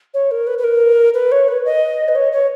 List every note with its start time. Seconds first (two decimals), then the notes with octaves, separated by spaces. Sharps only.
0.14 C#5
0.31 A#4
0.47 B4
0.58 B4
0.64 A#4
1.14 B4
1.32 C#5
1.48 B4
1.65 D#5
2.08 B4
2.15 C#5
2.32 C#5